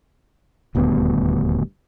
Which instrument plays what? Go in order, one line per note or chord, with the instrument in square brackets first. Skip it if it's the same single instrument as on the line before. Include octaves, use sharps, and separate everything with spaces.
[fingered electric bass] D#1 D2 G2 B3